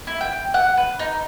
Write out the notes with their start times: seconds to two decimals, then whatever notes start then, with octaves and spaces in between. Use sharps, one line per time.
0.07 E4
0.21 G5
0.54 F#5
0.77 B4
0.99 D#4